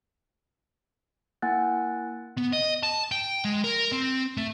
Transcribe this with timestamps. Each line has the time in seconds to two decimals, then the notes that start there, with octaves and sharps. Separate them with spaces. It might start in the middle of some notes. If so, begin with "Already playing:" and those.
1.42 A#3 E4 F#5 G#5 F#6 A6
2.37 B3
2.53 D#5
2.83 A5
3.12 G5
3.45 G#3
3.64 A#4
3.92 C4
4.37 A3